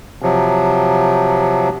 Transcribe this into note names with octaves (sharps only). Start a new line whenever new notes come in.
C3 F3 F#3